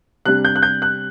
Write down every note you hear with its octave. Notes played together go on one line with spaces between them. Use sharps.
C3 G3 D4 F#6
G6
F#6
G6
F#6